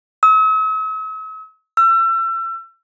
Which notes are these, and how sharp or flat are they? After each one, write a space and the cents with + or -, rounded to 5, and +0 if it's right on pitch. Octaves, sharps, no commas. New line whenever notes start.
E6 -45
E6 +35